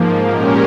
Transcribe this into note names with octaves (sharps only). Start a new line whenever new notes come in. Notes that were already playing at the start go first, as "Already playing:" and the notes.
Already playing: G#2 F3 A#3
A#2 G#3 C#4 G4 A#4